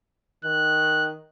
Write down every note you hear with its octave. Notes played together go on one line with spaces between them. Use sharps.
D#3 F#6